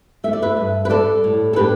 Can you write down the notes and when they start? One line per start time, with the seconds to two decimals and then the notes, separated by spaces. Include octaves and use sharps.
0.24 A3 E5
0.33 D5
0.42 B4 E5
0.57 G2
0.85 B4
0.90 G3 A4 D5
1.24 A2
1.53 A4
1.56 D4 G4 B4